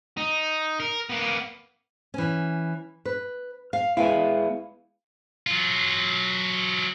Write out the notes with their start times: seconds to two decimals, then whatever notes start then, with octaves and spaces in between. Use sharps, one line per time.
0.17 D#4
0.80 A#4
1.09 A#3 B3
2.14 E3 C#4
3.05 B4
3.73 F5
3.97 G#3 B3 E4 F5 G5 G#5
5.47 F#3 F4